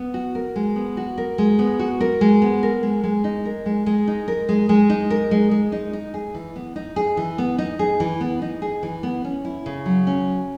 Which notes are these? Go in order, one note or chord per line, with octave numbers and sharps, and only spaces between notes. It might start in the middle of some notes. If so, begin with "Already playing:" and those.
Already playing: B3
F#4
A#4
G#3
B3
F#4
A#4
G#3
B3
F#4
A#4
G#3
B3
A#4
G#3
G#3
D#4
A#4
G#3
G#3
D#4
A#4
G#3
G#3
D#4
A#4
G#3
G#3
D#4
D#4
G#4
E3
B3
D#4
G#4
E3
B3
D#4
G#4
E3
B3
D#4
G#4
E3
B3
C#4
E4
C#3
F#3
C#4